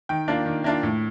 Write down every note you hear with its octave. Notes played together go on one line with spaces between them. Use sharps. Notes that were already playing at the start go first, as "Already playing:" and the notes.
D#3 G5
A#3 D4 F4
D#3
A#3 D4 F4
A2